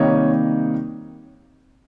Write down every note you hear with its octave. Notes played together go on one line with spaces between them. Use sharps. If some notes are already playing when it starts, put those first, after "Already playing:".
Already playing: C3 D#3 G3 A#3 D#4 C#5 D#5